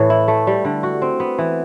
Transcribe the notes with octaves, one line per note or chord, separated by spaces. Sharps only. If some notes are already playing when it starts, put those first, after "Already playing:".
Already playing: A2 E3
E4
A3
G3
D3
F#4
C4
B3
E3